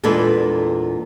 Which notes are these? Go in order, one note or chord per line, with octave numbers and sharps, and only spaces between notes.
E2 A#2 G#3 D4 A4 B4